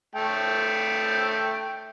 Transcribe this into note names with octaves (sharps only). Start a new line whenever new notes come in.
A3 G5